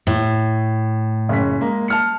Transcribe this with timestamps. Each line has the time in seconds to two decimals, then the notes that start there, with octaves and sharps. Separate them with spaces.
0.07 A2
1.29 F#1 C#4 B6
1.60 G#3 A#3
1.88 A5 F6 C#7